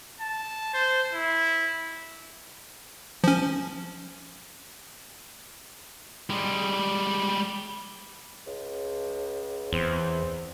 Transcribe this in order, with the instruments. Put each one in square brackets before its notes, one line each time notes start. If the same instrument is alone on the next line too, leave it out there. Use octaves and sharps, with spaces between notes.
[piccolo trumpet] A5
C5
E4
[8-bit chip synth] F3 C#4
[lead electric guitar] G3 G#3
[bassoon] C#2
[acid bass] E2 [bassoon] C4